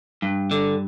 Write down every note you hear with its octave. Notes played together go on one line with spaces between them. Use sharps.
G2
D3